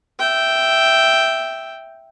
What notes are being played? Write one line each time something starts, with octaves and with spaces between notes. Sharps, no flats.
E5 G5